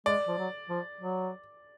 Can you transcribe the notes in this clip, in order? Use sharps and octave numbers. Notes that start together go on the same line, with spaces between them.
G#3 D5
F3
F#3
F3
F#3